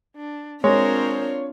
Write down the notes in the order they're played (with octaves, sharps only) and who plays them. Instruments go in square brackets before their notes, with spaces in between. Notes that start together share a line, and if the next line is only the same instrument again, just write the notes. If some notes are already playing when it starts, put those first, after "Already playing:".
[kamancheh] D4
[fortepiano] G#3 [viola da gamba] C4 D4 F4 [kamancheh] A#4 C5 [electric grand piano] C#5